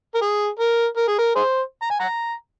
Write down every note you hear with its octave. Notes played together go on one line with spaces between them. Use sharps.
A#4
G#4
A#4
A#4
G#4
A#4
G#4 C5
A#5
G#5
F#5 A#5